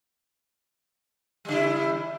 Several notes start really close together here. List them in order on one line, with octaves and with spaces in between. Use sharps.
G3 C#3 E4